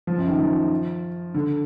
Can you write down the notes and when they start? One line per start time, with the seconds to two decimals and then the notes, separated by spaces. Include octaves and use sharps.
0.07 F3
0.18 F#2
0.28 D#3
0.40 F3
1.34 D3